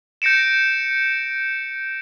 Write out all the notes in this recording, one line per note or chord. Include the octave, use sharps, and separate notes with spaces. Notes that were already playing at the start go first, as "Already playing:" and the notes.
G6 A#6 C#7 D7 E7